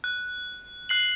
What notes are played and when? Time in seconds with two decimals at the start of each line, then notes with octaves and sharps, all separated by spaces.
0.04 F#6
0.89 F#6 C7 F#7